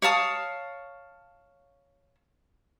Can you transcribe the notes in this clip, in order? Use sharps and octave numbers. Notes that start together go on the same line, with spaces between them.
C#5 F5 A5 D#6